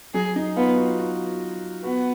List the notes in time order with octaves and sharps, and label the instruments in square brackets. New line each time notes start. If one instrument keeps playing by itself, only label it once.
[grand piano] F#3 [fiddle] G#4
[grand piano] D#4
[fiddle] B3 [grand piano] F4
[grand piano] F#4
F#4
[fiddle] B3 [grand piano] F#4